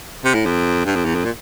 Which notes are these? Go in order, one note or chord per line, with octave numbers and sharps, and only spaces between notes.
C3
A2
F2
G2
F2
E2
F2
A#2